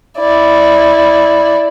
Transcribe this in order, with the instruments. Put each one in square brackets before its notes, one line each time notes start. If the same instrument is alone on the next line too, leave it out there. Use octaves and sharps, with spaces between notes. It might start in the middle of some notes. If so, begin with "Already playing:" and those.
[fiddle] E4 D5